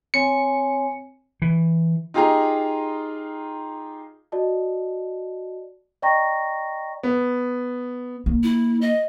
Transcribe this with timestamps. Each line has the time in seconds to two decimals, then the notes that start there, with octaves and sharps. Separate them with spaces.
0.14 C4 C#5 G#5 C#7
1.42 E3
2.14 D#4 F4 G4 G#4 A#5
4.32 F#4 D5 D#5 A5
6.02 D5 D#5 G5 A#5 C#6 A#6
7.03 B3
8.26 A#3
8.43 E4
8.81 D#5